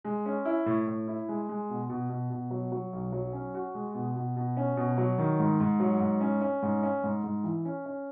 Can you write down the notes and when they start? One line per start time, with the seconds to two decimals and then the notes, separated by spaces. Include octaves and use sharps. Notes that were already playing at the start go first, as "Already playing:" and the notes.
0.05 G#3
0.26 C#4
0.45 E4
0.66 A2
0.87 A2
1.08 E4
1.29 G#3
1.49 G#3
1.70 B2
1.90 B2
2.10 B2
2.30 B2
2.51 F#3
2.72 F#3
2.93 B1
3.12 F#3
3.33 C#4
3.54 F#4
3.75 G#3
3.94 B2
4.16 B2
4.36 B2
4.57 C#4
4.77 B2
4.98 F#3
5.18 D#3
5.39 G#2
5.60 G#2
5.80 F#3
6.00 G#2
6.21 C#4
6.41 C#4
6.62 G#2
6.83 C#4
7.03 G#2
7.24 G#2
7.44 E3
7.65 C#4
7.86 C#4